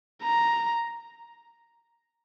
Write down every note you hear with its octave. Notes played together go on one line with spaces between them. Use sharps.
A#5